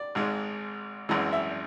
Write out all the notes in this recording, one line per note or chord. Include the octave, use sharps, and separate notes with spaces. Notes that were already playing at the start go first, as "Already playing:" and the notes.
Already playing: D5
G#1 G#2 G#3
G#1 F#2 E3 G#3
E5